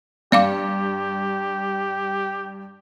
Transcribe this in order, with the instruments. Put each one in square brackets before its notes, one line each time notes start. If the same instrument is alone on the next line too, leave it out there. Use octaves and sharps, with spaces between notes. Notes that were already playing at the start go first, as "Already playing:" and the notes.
[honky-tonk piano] G2 [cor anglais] G4 [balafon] D5 F5 D6